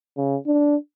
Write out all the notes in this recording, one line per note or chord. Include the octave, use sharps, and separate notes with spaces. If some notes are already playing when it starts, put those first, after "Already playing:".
C#3
D4